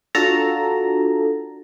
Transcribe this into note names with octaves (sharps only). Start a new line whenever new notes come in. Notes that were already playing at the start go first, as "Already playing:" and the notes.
D4 F4 F#4 A4 A5 A#5